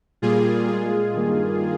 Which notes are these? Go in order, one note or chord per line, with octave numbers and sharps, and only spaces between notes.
A#2 G3 A#3 F4 G#4
A#2 G#3 F4 G#4
G2 D#3 A#3